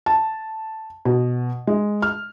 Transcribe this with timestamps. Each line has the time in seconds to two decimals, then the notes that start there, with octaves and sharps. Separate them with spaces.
0.06 A5
1.05 B2
1.67 G#3
2.02 F6